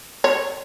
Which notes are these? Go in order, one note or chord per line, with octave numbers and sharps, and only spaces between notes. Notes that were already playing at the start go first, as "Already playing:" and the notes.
C#5